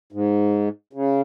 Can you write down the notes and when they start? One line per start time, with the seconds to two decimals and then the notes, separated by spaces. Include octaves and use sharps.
0.12 G#2
0.93 C#3